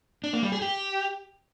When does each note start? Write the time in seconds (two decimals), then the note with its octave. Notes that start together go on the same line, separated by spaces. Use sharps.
0.24 D4
0.33 A#3
0.43 G3
0.52 G#4
0.62 G4